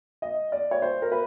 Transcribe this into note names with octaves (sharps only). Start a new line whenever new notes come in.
D#5
D5
C#5
C5
A#4
B4